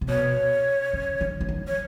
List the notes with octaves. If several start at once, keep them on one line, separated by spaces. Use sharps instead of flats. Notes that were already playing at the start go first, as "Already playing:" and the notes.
C3
B2 C#5
C#3
D3
E3
D#3
C#5